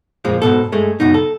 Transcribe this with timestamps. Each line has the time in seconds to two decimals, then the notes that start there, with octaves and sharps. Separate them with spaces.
0.25 F2 A#2 F3 G#3
0.42 G#2 B2 A4
0.72 G2 G#3 A3
1.00 C#2 F#2 B2 D#4
1.14 A4